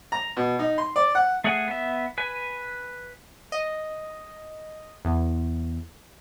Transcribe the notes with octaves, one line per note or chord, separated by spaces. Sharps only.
A#5
B2
D#4
C6
D5
F#5
A3 G#4 C#5 F#5 G#5
B3 E5
B4 G#5
D#5
E2